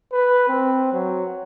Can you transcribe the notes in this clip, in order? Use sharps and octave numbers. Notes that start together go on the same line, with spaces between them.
B4
C4
F#3